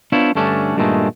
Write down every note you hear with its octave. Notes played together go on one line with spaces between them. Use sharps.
B3 D4 E4 F4 C5 C#5
G2 D3 A3 C#4 D4
G2 A#2 D#3 G#3 A3